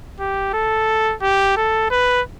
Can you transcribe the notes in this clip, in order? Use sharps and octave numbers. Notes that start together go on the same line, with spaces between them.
G4
A4
G4
A4
B4